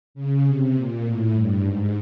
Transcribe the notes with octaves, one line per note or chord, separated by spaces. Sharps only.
C#3
C3
A#2
A2
G2
G#2